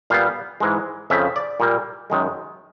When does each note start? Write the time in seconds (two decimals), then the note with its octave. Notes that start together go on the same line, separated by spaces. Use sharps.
0.10 A#2 G3 B3 F5
0.60 G#2 E3 G#3
1.10 F2 C#3 F3 E5
1.36 D5
1.60 A#2 G3 A#3
2.10 F#2 D#3 G#3